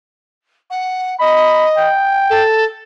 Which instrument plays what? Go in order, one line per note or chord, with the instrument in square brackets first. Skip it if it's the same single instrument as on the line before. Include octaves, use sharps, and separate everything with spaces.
[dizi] F#5
[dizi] D#5 [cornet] B5
[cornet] G5
[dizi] A4